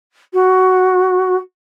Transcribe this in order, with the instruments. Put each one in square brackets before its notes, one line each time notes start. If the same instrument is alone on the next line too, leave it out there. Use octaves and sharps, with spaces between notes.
[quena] F#4